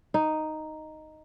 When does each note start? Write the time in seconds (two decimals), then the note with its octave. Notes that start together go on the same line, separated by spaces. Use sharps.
0.14 D#4